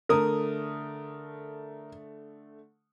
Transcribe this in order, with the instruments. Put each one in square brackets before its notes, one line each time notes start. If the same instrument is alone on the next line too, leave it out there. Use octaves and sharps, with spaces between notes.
[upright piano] D3 A3 D#6 [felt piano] A#4